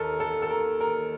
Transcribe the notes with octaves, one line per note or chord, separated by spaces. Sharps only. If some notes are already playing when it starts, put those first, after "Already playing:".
Already playing: D#2 A4 A#4
A4
A4
A#4
A#4